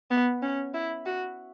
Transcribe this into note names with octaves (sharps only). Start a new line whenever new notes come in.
B3
C#4
E4
F#4